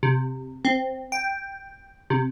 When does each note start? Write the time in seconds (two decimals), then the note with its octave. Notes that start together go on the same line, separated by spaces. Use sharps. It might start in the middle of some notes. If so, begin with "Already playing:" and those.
0.03 C3
0.65 C4
1.12 G5
2.10 C3